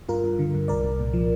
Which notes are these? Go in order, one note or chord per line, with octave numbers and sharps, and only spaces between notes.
G2 F4 A#4
G2
D3
G2
C2 A#4 D5
C2
A#2
F3